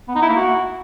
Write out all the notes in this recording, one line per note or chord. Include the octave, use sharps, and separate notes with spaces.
B3
D#4
E4
A#3
F#4